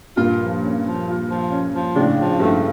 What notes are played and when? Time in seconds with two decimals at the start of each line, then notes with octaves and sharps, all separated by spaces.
0.17 G2 A#2 F4
0.40 F3
0.62 C#4
0.84 F3
1.07 F4
1.29 F3
1.51 C#4
1.73 F3
1.95 A2 C#3 D4
2.18 F3
2.40 G2 A3